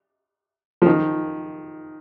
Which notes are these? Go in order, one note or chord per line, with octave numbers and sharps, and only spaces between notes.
F3
D#3